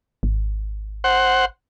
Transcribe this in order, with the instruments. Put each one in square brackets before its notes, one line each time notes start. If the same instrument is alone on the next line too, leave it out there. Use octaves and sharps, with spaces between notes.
[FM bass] G#1
[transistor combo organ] C5 F#5